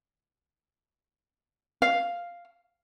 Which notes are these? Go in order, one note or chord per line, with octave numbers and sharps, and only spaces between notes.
F5